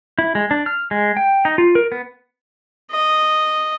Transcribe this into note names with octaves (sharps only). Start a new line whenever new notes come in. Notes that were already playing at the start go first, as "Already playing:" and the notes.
E4
G#3
D4
F6
G#3
G5
D#4
F4
A#4
B3
D#5